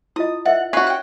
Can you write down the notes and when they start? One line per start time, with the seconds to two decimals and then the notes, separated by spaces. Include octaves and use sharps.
0.16 E4 F4 D#5 D#6
0.45 A#4 D#5 E5 F#5
0.73 C#4 F#4 B4 F5
0.87 G5 F#6